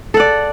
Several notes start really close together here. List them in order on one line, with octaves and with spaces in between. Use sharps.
A4 F#5 D5